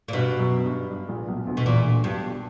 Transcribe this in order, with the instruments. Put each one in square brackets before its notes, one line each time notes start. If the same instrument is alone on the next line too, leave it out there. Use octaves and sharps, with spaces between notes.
[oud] A#2
[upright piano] G2 [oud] B2
[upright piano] F#2
G2
G2
A#1 A#2
B1 B2
D2 D3
[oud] B2
[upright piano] E2 E3 [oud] A#2
[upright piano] D2 D3
[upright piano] B1 B2 [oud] G2
[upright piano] A#2
B2